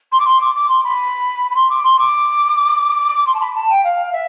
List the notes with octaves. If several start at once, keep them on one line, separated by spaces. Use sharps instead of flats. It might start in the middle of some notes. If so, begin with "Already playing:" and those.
C6
D6
C6
D6
D6
C6
B5
B5
C6
D6
C6
D6
C6
A5
B5
A5
G5
F5
E5